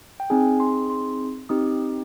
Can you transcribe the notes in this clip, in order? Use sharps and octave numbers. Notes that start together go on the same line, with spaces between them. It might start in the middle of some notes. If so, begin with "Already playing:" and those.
G5
C4 D#4 G#4 G#5
C6
C6
C4 D#4 G4 D#6